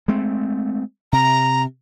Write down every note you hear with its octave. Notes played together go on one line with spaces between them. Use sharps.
G#3 A3 C4
C3 A#5